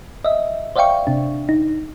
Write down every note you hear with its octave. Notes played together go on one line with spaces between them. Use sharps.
D#5 E5
C5 D5 E5 F5 G5 C#6
C3 D4
D#4